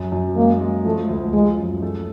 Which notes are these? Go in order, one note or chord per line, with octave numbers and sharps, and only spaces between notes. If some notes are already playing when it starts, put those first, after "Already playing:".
Already playing: F#2
F#2
G#3 A#3
G#3
F3 A3
D2
F3 G#3
F#2
A3